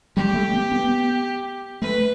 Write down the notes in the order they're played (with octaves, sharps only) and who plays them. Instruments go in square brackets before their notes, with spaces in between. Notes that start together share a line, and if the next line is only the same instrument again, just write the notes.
[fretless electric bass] G3 [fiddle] G4
[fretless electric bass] A3
B3
B3
[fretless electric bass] A3 [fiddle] B4